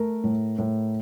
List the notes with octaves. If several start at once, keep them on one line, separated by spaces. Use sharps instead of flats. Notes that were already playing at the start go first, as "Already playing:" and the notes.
Already playing: A3 A#4
A2
A2